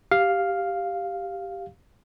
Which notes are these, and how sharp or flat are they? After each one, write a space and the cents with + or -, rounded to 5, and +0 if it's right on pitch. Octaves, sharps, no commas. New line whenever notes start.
G4 +0 F5 +0